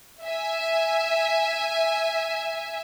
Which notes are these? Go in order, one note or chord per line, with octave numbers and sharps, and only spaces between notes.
E5 G#5